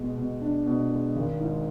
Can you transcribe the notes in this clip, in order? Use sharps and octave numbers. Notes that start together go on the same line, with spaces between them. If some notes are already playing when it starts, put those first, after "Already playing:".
Already playing: B2 G#3
B2
D4
B2
G#3
G#1
G#2